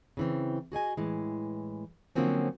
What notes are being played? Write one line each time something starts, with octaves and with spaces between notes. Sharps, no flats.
C#3 E3 C4
F#4 G#4 D#5 G#5
A2 E3 G#3
D3 F3 F#3 A#3 C4 C#4